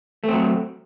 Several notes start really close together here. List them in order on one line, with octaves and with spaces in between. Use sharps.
A3 C4 F#3